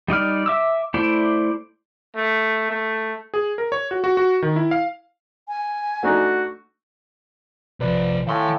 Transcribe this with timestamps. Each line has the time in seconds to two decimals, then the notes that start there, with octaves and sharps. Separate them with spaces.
0.08 G3 D#4 D5 F6
0.46 E5 D6 E6
0.94 A3 E4 C5 D5
2.16 A3
2.70 A3
3.34 G#4
3.58 A#4
3.72 C#5
3.91 F#4
4.04 F#4
4.17 F#4
4.42 D#3
4.56 E4
4.71 F5
5.48 G#5
6.03 A3 D4 D#4 F#4
7.80 A#1 C3 F3 B4 D5
8.27 A2 D#3 F5 G#5 C6